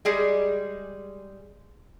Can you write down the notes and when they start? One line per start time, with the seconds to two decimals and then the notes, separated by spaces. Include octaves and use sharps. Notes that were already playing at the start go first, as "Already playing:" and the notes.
0.05 G3 G#3 G#4